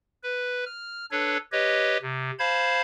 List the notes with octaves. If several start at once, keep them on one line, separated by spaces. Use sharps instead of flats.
B4
F6
D4 A4 B4 C#5
G4 B4 C#5 D#5
C3
C5 F5 A5 B5 G#6